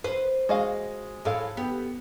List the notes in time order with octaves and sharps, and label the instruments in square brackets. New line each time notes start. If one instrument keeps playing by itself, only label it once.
[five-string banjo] B4 [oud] C5
[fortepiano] G#3 [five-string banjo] F#4 D#5 F5
[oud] A2 [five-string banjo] G#4 A4 F5
[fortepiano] B3 [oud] G4